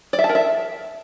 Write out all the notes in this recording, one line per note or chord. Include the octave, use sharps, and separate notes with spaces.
D5
E5
A5
A#4
E5